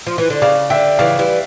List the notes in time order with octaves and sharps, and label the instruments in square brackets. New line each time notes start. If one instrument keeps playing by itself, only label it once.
[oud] F3
E3
D3
[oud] C#3 [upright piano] D5 F5
[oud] D3 [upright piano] E5 G5
[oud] C#3 E3 [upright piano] D5 F5
[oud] E3 G3